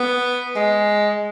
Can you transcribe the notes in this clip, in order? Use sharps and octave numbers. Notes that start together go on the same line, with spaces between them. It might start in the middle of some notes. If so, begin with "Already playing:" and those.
Already playing: B3
G#3